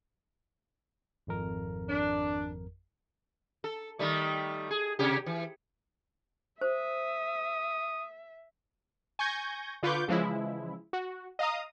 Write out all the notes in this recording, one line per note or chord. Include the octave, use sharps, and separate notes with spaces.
G#1 F2 A#4
D4
A4
D#3 G3 A3
G#4
C3 G4
E3
C5 E5 D#6
G#5 C#6 G6 G#6 A#6
D3 F4 B4 C#6 D6 G6
C#3 E3 F3 G#3 E4
F#4
D#5 F5 A#5 D#6